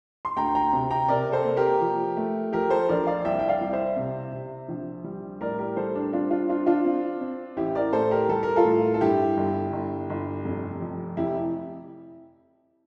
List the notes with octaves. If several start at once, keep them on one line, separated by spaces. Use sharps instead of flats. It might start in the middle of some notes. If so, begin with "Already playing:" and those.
C6
D2 G5 A#5
G5 A#5
C3
G5 A#5
C3 A#4 D5
A4 C5
A#3
G4 A#4
F3
A3
F3 G4 A#4
A4 C5
A#1 A#4 D5
D5 F5
C2 E5 G5
G5
D5 F5
C2
C5 E5
C3
C3
A#1
G3
A2 A#4 D5
G4 A#4
G3 A4 C5
D4
C4 D4 F4
D4 F4
C4 D4 F4
D4 F4
C4
C4
A1 E4 G4
A#4 D5
A2 A4 C5
G4 A#4
G3 A4
A#4
F4 A4
A2
A4
G2 E4 G4
G1
G1
G1
F1
F2
F1 E4 G4